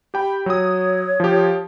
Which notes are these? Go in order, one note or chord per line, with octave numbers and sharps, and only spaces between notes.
G4 G5 B5
F#3 C#5 D#6
F3 G4